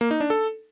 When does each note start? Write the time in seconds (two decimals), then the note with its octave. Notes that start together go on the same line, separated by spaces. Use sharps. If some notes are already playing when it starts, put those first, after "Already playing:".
0.01 A#3
0.11 D#4
0.20 D4
0.30 A4